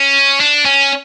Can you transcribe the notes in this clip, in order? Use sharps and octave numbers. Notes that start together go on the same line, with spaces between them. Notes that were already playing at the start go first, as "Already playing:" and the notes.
Already playing: C#4
D4
C#4